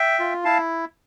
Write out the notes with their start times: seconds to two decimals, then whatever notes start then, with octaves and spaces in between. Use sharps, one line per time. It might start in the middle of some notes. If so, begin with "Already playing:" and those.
Already playing: E5 G5
0.20 F4
0.45 E4 F5 A5